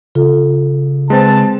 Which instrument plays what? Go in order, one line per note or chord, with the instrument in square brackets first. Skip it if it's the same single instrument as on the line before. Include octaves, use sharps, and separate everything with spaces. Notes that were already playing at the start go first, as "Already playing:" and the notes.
[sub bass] C#3 [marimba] F4 A4
[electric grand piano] G#3 C4 [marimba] B4 C5 C6 [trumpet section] A5